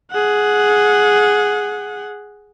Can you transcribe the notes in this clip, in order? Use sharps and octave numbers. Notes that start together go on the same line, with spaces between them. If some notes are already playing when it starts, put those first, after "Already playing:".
G#4 F#5